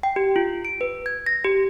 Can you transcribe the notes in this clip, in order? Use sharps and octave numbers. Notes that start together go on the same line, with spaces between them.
G5
G4
F4
D7
B4
G#6
A#6
G4